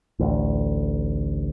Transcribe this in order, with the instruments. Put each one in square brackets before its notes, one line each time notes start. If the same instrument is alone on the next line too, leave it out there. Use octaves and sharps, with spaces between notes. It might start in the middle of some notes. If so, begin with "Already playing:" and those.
[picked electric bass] A1 D2